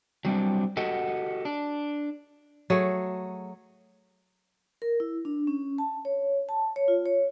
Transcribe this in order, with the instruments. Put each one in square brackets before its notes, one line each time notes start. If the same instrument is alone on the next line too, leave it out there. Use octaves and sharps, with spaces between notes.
[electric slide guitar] F#3 G3 C4 D4
F#4 G4 A4 D#5 F#5
D4
[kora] F#3 A3 G#4
[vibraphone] A#4
E4
D4
C#4
A5
C#5
A5
C#5
F4
C#5